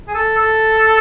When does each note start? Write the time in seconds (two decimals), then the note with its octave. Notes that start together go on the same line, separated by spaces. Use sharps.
0.08 G#4
0.15 A4
0.38 A4